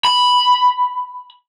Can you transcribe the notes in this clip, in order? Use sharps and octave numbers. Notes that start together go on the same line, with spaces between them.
B5